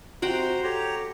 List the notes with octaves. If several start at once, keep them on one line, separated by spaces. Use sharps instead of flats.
C3 F#4 C5 F#5 G5 A#5 C6
G4 A4 C#5 A#5